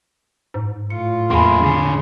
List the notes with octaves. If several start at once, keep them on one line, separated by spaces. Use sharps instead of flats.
G#2
A2 F4 C#7
E2 A#3 G#4 B5 C6
D3 G#4